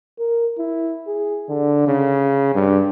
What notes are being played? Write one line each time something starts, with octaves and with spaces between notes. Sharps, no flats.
A#4
E4
G#4
D3
C#3
G2